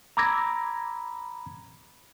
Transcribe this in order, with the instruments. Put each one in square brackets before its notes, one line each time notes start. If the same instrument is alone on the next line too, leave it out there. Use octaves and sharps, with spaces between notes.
[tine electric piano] A#5 B5 D6 E6 G#6 A#6